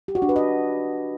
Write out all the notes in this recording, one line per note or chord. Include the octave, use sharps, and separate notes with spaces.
G4
F#4
D4
B4
D#5